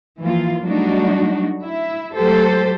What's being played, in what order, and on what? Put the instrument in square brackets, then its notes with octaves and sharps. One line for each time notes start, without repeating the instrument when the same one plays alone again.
[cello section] E3 F3 A#3 F4
F#3 G3 A3 D4 D#4 F#4
E4 E5
F#3 G#3 A3 G4 A4 C5